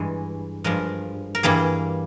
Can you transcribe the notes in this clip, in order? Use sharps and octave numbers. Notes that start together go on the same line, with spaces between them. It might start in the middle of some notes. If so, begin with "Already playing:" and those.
Already playing: G2 E3 G#3
G2 F3 G#3 A#4
A#4
G2 E3 G3 A#3 G#4